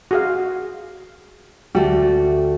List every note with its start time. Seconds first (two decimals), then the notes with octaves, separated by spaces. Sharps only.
0.11 F#4 G#4 F5
1.75 D2 A3 F#4 G4